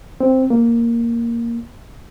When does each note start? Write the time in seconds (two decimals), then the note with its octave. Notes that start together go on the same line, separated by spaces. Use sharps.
0.20 C4
0.50 A#3